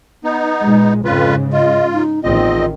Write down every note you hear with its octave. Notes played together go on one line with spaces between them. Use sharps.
B3 D#4
A#2 G#3
F2 G#2 C#3 F4 B4
F4 D#5
D#4
A1 E2 D#3 C4 F4 D#5